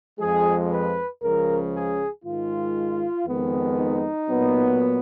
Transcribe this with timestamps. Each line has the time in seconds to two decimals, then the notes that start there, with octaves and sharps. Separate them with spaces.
0.20 F2 F3 G#3 G#4
0.71 B4
1.22 C#2 C#3 F3 A#4
1.73 G#4
2.24 G#2 D#3 G#3 F4
3.26 F2 D#3 G#3 B3
3.78 D#4
4.29 A#2 F#3 B3